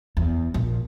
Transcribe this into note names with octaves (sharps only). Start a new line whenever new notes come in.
E2
A#1